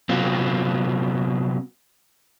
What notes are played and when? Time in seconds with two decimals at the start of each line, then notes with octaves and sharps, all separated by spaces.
0.09 C3 F#3 B3 C4 F4